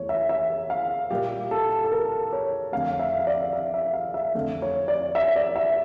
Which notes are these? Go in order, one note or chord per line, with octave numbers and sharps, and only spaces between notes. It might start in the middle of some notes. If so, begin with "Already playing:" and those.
Already playing: E2 E3 A3 C#5
E5
E5
F5
A#2 G3 A#3 G4
A4
A4
A#4
C#5
F2 D3 A3 F5
E5
E5
D5
E5
E5
F5
E5
F2 D3 A3
C#5
D5
E5
D5
E5